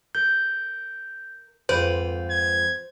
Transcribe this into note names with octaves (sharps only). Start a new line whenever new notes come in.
A#4 G6
F2 G#2 F4 B4 C5
G#6